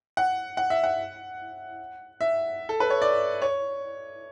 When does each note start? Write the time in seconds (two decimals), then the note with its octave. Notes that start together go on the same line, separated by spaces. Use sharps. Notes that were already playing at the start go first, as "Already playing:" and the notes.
0.17 F#5
0.57 F#5
0.70 E5
0.84 F#5
2.21 E5
2.69 A4
2.80 B4
2.90 C#5
3.02 D5
3.42 C#5